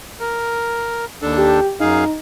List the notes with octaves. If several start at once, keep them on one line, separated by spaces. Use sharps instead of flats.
A#4
D#2 D4 A4
G4
F#2 D#4 G#4 F5